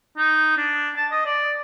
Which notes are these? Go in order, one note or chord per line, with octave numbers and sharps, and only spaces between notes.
D#4
D4
A5
D#5
D5